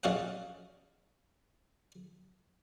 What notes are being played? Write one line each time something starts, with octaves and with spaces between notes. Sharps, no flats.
A#1 C#4 F#4 D#5 F5 F#5